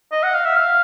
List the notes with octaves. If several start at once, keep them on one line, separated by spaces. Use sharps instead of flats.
D#5
F#5
F5
E5
F5